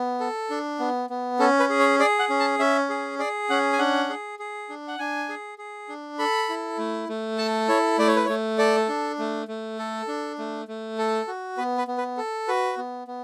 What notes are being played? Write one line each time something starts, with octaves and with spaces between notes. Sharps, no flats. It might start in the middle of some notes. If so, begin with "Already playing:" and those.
Already playing: B3
A4
D4
B3
B3
C#4 A4
B4
G#4
C#5
G#4 D5
F#5
C#4
A5
C#4 E5
G#4
G#4 D5
C#4 F#5
G#5
D4 F#5
G#4
G#4
D4
F#5
D4 G#5
G#4
G#4
D4
A4 B5
E4
A3
A3
A4 A5
E4 C#5
A3 D5
C#5
B4
A3 C#5
A4 D5
D4
A3
A3
A4
D4
A3
A3
A4
F#4
B3 B4
B4
B3
B4
A4
F#4 B4
B3
B3